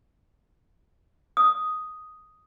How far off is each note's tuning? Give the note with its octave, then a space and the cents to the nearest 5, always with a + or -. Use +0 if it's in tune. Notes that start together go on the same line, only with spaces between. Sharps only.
D#6 +5